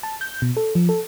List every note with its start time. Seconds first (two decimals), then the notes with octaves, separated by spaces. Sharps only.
0.03 A5
0.21 G6
0.42 B2
0.57 A4
0.75 F3
0.89 A4